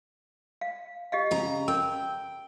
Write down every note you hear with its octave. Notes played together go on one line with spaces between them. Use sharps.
F5
G4 D#5 F5
C#3 A#5
A#4 G5